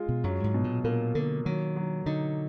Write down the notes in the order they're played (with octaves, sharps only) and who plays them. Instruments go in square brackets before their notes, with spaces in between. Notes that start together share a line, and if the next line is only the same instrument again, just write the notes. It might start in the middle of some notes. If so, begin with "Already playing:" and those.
Already playing: [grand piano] G#3 F4
[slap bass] B2
[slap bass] F#2 [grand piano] F#3
[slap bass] G#2
[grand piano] B2
[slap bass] A#2
[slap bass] A#2 [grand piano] A#3
[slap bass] D3 [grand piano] A#3
[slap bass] D#3 [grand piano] F#3
[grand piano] F#3
[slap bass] D3 [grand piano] D#4